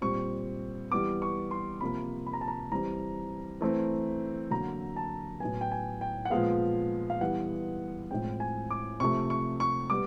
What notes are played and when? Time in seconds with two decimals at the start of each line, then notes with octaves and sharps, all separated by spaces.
0.01 A#2 G3 C4 C#6
0.91 E3 G3 B3 D6
1.22 C#6
1.51 C6
1.81 C3 F3 A#3 B5
2.26 B5
2.33 A#5
2.41 A5
2.48 A#5
2.72 E3 G3 C4 A#5
3.61 E3 A3 C4
4.50 D3 F#3 A#3 A#5
4.96 A5
5.40 A2 F#3 B3 G#5
5.61 G5
5.71 G#5
6.01 G5
6.25 F#5
6.30 A#2 F3 G#3 B3 F5
7.10 F5
7.21 E3 G3 B3 F#5
8.11 A2 F3 G#3 C4 G5
8.40 G#5
8.71 D6
9.00 C3 F3 A3 C#6
9.30 C#6
9.60 C#6
9.90 G3 B3 D6